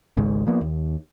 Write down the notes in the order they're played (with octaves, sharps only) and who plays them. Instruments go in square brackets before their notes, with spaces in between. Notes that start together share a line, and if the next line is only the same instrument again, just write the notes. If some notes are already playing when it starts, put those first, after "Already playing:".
[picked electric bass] G#1 C#2 G#2 C#3
F3 A#3 B3
D#2